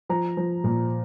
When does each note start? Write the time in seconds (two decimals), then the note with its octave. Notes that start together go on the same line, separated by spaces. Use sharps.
0.09 F3 A#5
0.37 F3
0.64 A#2